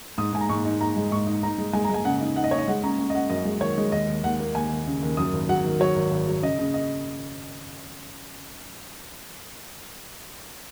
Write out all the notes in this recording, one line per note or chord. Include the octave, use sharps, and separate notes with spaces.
G#2 D#6
G#2 G#5
A#5
G#2 C#6
D#4
D#4 A#5
G#3
G#2 C#6
D#4
D#4 A#5
G#3
G#3 G#5
A#5
G#3 G#5
C#3 F#5
D#4
D#4 F#5
D#5
D#4 C#5
D#5
G#3 F#5
C#4 A#5
C#4
D#5
C#4 F#5
F#2 D#5
G#3
D#3 C#5
G#3
D#2 D#5
D#2
D#2 F#5
A#3
D#2 G#5
D#2
C#3
D#2
F#2 D#6
G#1
F#3 F#5
D#3
F#3 C#5
G#1
G#1
F#3
C#3 D#5
C#3
D#5